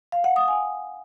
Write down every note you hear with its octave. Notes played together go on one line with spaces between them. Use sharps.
F5
F#5
D#6
G#5